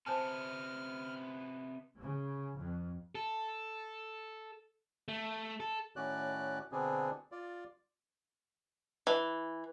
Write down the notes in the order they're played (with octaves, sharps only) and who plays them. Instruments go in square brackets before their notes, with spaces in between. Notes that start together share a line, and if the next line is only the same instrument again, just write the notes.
[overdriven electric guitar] C3 B3 [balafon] C5 G#5 A5 [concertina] F6
[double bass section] C#3
F2
[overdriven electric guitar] A4
A3
A4
[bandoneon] A2 D#3 C#4 F#4 D5 F#6
B2 D3 B3 C4 D4 G#4
F4 D5
[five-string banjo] E3